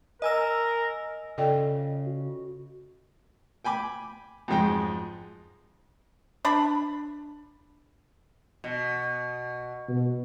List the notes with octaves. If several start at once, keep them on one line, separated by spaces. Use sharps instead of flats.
A#4 D#5 G#5 E6
C#3 F4 A4 D5 D#5 G5
F#4
G5 G#5 B5 D6
F2 G#2 F#3 G#3 G#4 G5
D4 B5
B2
B2